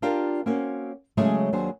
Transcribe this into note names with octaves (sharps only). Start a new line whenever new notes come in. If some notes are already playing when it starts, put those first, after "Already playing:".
D4 F4 G4 A#4 D5 F5
A#3 C4 C#4 F#4
C#3 F#3 G#3 A3 G#4 C#5
D#2 F#3 D4 G#4 C5